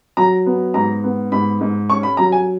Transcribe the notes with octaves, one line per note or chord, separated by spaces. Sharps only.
F#3 A#5
B3
G#2 A#5
B3
G#2 B5
G#2
C#4 C#6
B5
F#3 A#5
G#5